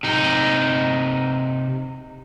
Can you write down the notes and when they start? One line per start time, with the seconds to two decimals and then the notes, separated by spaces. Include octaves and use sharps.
0.03 C3 D#4